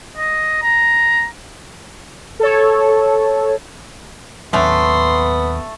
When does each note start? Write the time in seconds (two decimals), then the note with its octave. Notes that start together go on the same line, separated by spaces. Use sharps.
0.17 D#5
0.62 A#5
2.40 A4 C#5
4.53 D#2 A2 F#3 A3 B3 C#4 D4 C6